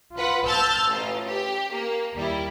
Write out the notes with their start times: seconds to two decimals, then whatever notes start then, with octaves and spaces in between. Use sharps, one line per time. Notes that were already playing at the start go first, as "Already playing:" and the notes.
0.16 F4 B4 F#5
0.45 A5 E6 F6 G6 A6
0.88 A1 F4
1.27 G4
1.73 A#3
2.15 D#2 G3 E4